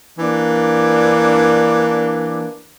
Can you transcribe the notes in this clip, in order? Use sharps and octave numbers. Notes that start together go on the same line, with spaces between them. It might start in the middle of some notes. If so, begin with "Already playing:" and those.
E3 A#3 D4